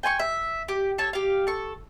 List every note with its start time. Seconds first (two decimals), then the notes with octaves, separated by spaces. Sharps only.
0.03 G5 G#5 C6 C#6
0.19 E5
0.68 G4
0.98 A4 C#5 A5
1.13 G4 F5
1.47 A4 C#6